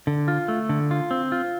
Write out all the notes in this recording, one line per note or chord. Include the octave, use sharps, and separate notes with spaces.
D3
F4
A3
D3
F4
C4
F4